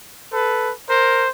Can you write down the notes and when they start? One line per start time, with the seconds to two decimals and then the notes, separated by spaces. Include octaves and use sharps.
0.31 A4 B4
0.87 A#4 C5